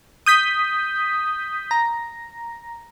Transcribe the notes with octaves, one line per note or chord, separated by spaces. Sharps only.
D#6 G6 B6
A#5